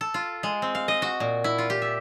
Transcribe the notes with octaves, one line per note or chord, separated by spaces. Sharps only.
A4
F4
G#3
C4
F5
D#5
F#4
A#2
E4
F4
G4
E5